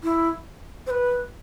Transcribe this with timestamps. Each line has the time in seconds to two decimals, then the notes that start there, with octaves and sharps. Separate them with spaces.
0.03 E4
0.87 C5
0.90 B4